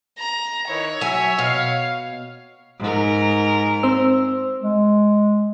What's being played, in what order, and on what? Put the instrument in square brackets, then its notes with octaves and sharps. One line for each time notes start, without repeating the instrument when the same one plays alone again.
[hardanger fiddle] A#5
[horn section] D#3 E4 B4 [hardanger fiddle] C#5
[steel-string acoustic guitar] F#3 G#5 [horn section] E5
[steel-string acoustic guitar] B2 [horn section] F5
[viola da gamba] G#2 A#4
[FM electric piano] C4 C5 E6
[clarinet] G#3